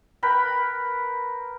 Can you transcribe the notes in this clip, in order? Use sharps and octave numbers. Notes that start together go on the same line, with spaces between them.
A#4 B4 G5 B5